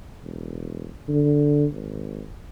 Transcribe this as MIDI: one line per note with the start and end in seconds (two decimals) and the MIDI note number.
0.23 0.88 28
1.08 1.66 50
1.72 2.24 32